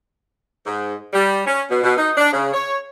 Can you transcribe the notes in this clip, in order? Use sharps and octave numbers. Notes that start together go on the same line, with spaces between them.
G#2
G3
C#4
B2
B2
D#4
D4
C#3
C#5